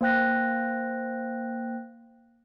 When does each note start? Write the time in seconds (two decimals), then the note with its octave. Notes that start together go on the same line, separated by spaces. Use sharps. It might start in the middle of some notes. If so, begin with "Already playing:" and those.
0.01 A#3 C5 G5 F#6 A#6